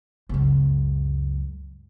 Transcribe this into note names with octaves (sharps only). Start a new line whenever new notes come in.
C#2 F#2